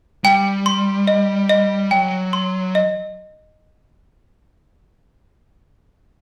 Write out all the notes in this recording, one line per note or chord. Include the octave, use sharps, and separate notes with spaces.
G3 G5
C6
D#5
D#5
F#3 G5
C6
D#5